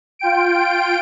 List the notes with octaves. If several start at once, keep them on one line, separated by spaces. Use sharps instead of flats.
F4 G5 D7